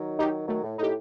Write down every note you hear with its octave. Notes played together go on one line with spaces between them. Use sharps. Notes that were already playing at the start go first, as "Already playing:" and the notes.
Already playing: D#3 F#3
D#4 G4
D#3 F#3 A3
A2
A2 D#4 G4